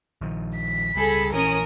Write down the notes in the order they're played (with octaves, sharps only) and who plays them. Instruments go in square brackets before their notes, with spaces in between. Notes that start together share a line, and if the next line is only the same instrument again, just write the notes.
[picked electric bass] A#1 D#3 F3
[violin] B6
[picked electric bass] C#2 G3 [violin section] G#4 A4 B5
[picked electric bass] A#1 E3 [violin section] C#4 D#6 [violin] A#4